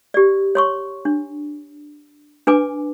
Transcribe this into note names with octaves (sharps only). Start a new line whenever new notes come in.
G4 D5
C#5 C6 C#6
D4
D4 B4 G#5 D6